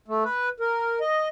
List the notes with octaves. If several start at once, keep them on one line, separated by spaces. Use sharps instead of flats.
A3
B4
A#4
D#5